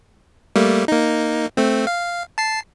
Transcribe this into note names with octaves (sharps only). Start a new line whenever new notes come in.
G3 A3 A#3
A#3 D#4
A3 C4
F5
A5 C7